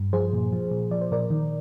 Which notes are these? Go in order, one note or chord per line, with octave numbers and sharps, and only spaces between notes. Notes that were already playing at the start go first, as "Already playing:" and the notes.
Already playing: G2
F3 G#4 C5
A#2
F3
A#2
F3 D5
C5
A#2 A#4 D5
D#3